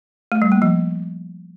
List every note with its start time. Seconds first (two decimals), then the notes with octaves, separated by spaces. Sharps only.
0.32 A3
0.42 G3
0.52 A#3
0.62 F3